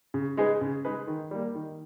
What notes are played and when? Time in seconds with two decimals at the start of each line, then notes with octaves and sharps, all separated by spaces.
0.14 C#3
0.37 G#3 D#4 G#4 B4
0.61 C#3
0.85 G#3 D#4 G#4 B4
1.07 D#3
1.31 G3 A#3
1.55 D#3